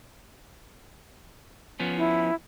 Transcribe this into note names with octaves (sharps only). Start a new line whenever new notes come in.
F3 B3 C#4
E4